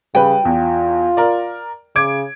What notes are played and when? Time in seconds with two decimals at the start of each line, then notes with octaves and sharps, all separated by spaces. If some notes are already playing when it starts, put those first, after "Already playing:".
0.15 C#3 G3 B4 G5
0.45 E2 F4
1.17 A#4 D5
1.96 C#3 D6 G#6 D7